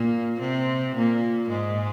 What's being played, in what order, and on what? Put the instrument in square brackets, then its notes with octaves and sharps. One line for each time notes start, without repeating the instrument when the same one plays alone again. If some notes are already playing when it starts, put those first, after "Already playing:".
Already playing: [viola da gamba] A#2 A#3
C3 C4
A#2 A#3
G#2 G#3